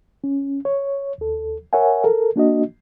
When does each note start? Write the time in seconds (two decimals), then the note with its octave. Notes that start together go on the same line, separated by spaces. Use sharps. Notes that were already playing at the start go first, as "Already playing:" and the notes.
0.24 C#4
0.65 C#5
1.18 D#2 A4
1.73 A#4 C#5 E5 F#5 G#5
2.04 A4 A#4
2.36 A#3 D4 F#4 D#5